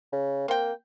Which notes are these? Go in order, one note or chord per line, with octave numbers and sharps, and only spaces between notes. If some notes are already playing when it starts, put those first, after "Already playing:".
C#3
A#3 C4 G5